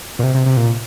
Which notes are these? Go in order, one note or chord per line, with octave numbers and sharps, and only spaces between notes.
A#2
C3
C3
C3
A#2